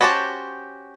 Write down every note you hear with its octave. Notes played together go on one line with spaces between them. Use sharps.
C#4 F#4 G4 C5 A5